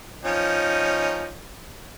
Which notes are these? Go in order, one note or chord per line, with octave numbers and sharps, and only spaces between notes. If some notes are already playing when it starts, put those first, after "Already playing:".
F3 C#4 D#4